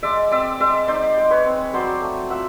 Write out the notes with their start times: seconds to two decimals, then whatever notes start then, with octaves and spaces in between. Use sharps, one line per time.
0.03 G#3 D5 E5
0.31 C4 D5 E5
0.60 G#3 D5 E5
0.88 D#4 C5 D5
1.17 G#3
1.31 B4 C#5
1.45 C4
1.74 F#3 C5 D5
2.01 A3
2.30 F4 E5 F#5